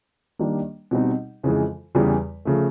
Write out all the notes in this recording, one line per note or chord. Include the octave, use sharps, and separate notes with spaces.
D#3 G3 A#3 D4
B2 G3 C4 D#4
F2 C#3 E3 G#3
E2 C#3 E3 G3
C#3 F3 A3